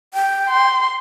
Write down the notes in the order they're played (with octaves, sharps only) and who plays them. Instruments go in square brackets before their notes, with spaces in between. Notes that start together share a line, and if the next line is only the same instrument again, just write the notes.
[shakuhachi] G5
[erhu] C6